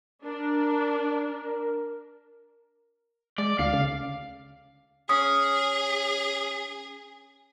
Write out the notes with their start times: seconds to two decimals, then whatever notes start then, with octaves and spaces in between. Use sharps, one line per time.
0.24 D4 A#4
3.38 G#3 D5
3.59 D2 F5
3.73 C#3
5.09 C#4 G#4 D#6